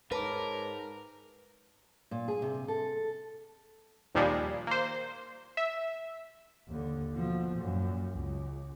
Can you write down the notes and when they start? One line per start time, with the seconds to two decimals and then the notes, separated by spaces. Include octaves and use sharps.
0.12 G#2 A#4 B4 C#5 A5 D6
2.11 A#2
2.28 G#4
2.42 C3
2.68 A4
4.15 D#2 A#2 F3 G3 G#3
4.67 A#3 C5
5.57 E5
6.68 D#2 D3
7.15 B2 F3
7.56 F#2 A#2
8.13 C#2